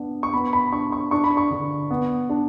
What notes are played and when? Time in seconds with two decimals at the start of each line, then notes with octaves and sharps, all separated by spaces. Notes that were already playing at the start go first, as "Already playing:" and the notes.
Already playing: B3 D4
0.23 C#6
0.33 B3 B5
0.53 B5
0.73 D4 C#6
0.92 C#6
1.11 D4 C#6
1.24 B5
1.37 C#6
1.51 D3
1.91 B3
2.29 D4